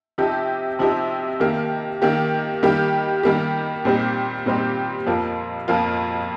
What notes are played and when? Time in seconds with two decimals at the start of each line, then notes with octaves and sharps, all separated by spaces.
0.18 C3 F3 D#4 G4
0.79 C3 F3 D#4 G4
1.40 D#3 A#3 G4
2.02 D#3 A#3 G4
2.63 D#3 G3 A#3 G4
3.23 D#3 G3 A#3 G4
3.85 A#2 G3 C4 D#4 G4
4.46 A#2 G3 C4 D#4 G4
5.06 F2 F3 A#3 F4
5.68 F2 F3 A#3 F4